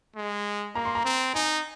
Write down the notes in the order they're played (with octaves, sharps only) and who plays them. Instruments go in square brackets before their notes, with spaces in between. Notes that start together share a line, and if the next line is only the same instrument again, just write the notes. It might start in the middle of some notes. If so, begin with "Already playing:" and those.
[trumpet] G#3
[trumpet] A#3 [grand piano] A#5
[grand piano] C6
A#5
[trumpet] C4
[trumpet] D#4 [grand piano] G#5